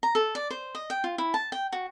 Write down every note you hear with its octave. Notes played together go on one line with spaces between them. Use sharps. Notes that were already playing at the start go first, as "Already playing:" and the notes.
A#5
A4
D5
C5
D#5
G5
F4
E4
A5
G5
F#4